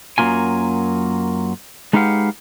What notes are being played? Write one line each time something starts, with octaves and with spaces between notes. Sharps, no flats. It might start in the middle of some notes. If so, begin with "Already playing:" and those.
F#2 F#3 A#3 F4 G#5
G#3 D#4 G4 B4 F5 F#5